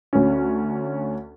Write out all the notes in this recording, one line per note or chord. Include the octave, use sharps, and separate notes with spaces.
D2 C#4